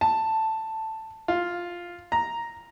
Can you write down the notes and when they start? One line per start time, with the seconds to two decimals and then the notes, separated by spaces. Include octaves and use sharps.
0.01 A5
1.28 F4
2.12 A#5